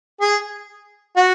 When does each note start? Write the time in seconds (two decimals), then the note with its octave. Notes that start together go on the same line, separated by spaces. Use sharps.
0.21 G#4
1.16 F#4